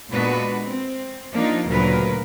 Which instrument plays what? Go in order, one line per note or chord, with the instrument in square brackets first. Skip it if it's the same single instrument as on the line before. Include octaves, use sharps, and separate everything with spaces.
[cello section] A#2 G#3 B3 D4 F#4 B4
C4
F3 A#3 D4 D#4 F4
D2 A#2 C#3 F#3 A#4 B4